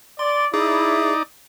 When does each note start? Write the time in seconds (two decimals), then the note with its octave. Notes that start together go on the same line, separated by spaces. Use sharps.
0.19 D5 C6
0.54 D#4 E4 G#4 D5